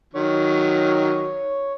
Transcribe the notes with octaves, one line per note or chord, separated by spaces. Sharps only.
D#3 F#3 C#5